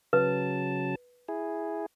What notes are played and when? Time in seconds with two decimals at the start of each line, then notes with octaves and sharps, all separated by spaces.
0.13 C#3 F#3 B4 A5
1.28 E4 G#4